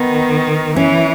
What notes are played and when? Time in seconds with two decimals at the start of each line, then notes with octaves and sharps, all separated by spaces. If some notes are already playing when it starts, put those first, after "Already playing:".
Already playing: D#3 B3
0.76 E3 C#4